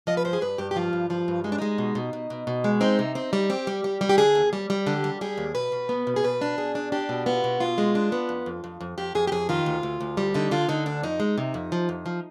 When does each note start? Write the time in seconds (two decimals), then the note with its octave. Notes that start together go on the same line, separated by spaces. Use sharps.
0.07 F3 D#5
0.17 B4
0.25 G2 C5
0.33 G#4
0.41 G2 B4
0.58 G2 G4
0.71 G4
0.76 F3 F4
0.93 G2
1.10 F3 F4
1.28 G2
1.44 G#3 D#4
1.52 D4
1.58 G#3 D#4
1.78 B2
1.95 B2
2.13 B2
2.30 B2
2.47 B2
2.64 G#3
2.81 C4 D#4
2.99 C3
3.15 C4 D#4
3.33 G3
3.50 C4 G4
3.67 G3
3.84 G3
4.01 G3
4.09 G4
4.18 D3 G#4
4.35 D#2
4.53 G3
4.70 G3
4.86 D3 G4
5.04 G3
5.21 G3 G#4
5.38 D#2
5.55 B2 B4
5.72 B2
5.89 B3
6.07 B2
6.16 G#4
6.24 B2 B4
6.41 D4
6.58 B2 G#4
6.75 D4
6.92 D4 G4
7.09 B2
7.26 B3 F4
7.44 B2
7.60 B2 F4
7.78 G#3
7.95 D4
8.12 B3
8.29 F2
8.46 F2
8.64 F2
8.81 F2
8.98 F2 G4
9.15 F2 G#4
9.27 G4
9.32 F2 G#4
9.49 D#3 F4
9.66 D2
9.83 D2
10.01 D2
10.17 G3
10.34 D3 D#4
10.51 D3 F4
10.69 D3 D#4
10.86 D2 D4
11.03 F2 D#4
11.20 G#3
11.38 C3
11.54 F2
11.72 F3
11.89 F2
12.06 F3